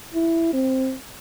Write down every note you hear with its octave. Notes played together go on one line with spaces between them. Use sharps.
E4
C4